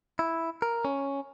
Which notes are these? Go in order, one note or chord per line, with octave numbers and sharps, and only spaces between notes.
E4
A#4
C#4